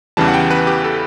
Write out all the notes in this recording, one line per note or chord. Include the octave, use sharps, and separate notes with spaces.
E2 C#3 E3 G3 A5
F#5
G5
B4
G4
A4